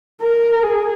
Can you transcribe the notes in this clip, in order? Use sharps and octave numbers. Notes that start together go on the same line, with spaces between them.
A#4
G#4